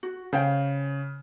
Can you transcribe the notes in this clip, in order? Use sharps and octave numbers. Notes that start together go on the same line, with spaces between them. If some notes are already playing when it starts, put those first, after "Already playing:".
F#4
C#3 C5 F5 G5